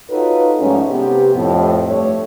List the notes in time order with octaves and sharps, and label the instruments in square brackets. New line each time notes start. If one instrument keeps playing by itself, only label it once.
[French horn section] D#4 F4 F#4 A4 B4 C#5
G#2 F3 G3 A3 C#4
C3 B3 G4
F2 A2
G2 A3 D4 C#5